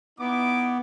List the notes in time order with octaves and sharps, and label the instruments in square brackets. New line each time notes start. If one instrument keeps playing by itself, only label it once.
[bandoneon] B3 [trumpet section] D#4 E4 D6